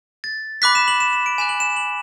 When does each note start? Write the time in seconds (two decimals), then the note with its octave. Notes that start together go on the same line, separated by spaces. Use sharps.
0.24 A6
0.62 B5 D6 F#6 B6
0.75 E7
0.88 F#7
1.00 E7
1.13 E7
1.26 D7
1.38 G#5 B5 F#6 E7
1.49 F#7
1.60 E7
1.77 F#7